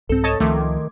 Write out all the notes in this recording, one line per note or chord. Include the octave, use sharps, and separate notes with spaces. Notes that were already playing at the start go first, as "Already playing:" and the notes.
C2 G#2 C4 A4
C#5 D#5 A5
C#2 D#3 F3 A3 C6 D6 G#6